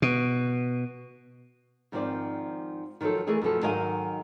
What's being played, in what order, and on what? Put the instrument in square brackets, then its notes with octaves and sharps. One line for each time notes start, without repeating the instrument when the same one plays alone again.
[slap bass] B2
[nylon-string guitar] G#2 D#3 F3 C4 C5 D5
D#3 F3 F#3 D#4 A4
E3 A3 G#4 A#4 D#5
F#2 B2 F3 A4
G#2 D#3 F#3 D#5 F5 G#5